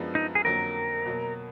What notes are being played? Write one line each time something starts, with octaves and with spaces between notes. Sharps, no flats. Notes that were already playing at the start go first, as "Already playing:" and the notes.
Already playing: F#2 F3 G#3 B3 D4
D#4
G#4
F2 D3 F#3 A#3 A#4
B2 F#3 A#3